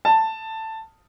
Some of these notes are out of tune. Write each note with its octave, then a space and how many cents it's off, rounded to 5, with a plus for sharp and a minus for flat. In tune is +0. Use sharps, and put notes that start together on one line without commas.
A5 +10